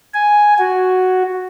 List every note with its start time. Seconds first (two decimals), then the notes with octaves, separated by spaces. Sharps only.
0.14 G#5
0.59 F#4